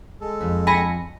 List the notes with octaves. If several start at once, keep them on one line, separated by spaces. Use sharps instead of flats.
G#3 A4
F2
G#5 B5 A#6 C#7